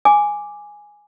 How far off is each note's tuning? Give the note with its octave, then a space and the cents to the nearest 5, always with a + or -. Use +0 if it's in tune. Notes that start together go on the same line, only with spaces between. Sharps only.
G#5 -5 D6 +0